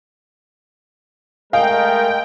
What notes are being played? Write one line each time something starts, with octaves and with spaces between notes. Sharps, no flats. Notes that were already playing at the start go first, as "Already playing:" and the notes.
G#3 A3 A#4 D#5 F5 G5 G#5